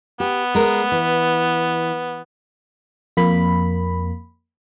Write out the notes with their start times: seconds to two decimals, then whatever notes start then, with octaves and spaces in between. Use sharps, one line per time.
0.20 B3 G4
0.55 G#3 A#4
0.92 E3
3.17 F2 A#3 B5